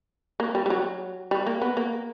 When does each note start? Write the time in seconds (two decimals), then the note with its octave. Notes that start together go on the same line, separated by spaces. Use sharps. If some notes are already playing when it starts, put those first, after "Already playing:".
0.40 A#3
0.55 G3
0.66 G3
0.70 F#3
1.31 G3
1.47 A#3
1.62 B3
1.77 A#3